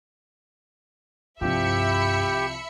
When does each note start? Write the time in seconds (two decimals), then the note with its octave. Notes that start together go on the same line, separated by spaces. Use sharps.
1.41 C2 G2 F3 G4 E5 B5 C#7